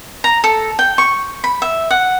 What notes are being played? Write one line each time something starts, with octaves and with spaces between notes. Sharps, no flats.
A#5
A4
G5
C#6
B5
E5
F#5